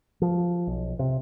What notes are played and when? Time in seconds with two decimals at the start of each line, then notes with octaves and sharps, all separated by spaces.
0.22 F3
0.67 B1
0.99 C3